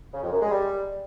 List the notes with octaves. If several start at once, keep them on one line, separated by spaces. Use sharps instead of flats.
C#3
F2
F#2
G#3
G3